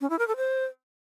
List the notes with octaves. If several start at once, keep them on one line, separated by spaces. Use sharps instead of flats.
C#4
E4
A#4
A4
C5